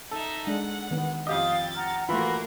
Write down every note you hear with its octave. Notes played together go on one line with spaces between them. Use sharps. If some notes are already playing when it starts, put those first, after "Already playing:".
D#4 A4 E5
G#3 D4 F#5
D#3 B3
F2 G4 D#5 F5 G5 D#6 A6
F#5 A#5 F6
E3 A3 A#3 F4 F#4 A#4 B5